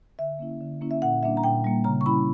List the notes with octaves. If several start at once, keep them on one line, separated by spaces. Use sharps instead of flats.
D3 E5
A#3 C#4 E4
D3
A#3 C#4 E4
E5
A#2 F#5
G3 A#3 D4 E5
A#5
A#2 G5
G3 A#3 D4
C#3 A#5
C#6
G3 C#4 E4 B5